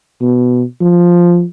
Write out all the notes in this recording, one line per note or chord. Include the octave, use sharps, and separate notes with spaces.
B2
F3